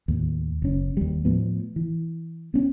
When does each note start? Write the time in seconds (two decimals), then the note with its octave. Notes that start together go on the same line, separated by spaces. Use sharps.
0.08 D#2 A2
0.62 F#1 C#4
0.97 D#2 G3
1.25 A2 F3 B3
1.76 E3
2.54 B3 C#4